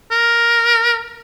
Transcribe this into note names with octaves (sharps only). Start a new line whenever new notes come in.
A#4